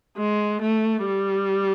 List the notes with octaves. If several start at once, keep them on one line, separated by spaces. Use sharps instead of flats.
G#3
A3
G3